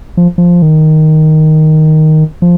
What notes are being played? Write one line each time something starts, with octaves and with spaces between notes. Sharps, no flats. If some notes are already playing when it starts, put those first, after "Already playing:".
F3
F3
D#3
F3